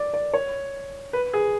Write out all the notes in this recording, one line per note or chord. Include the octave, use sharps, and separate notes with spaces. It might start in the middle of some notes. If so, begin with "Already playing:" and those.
Already playing: D5
D5
C#5
B4
G#4